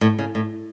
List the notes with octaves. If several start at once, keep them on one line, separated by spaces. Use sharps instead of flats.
A2
C#3
A2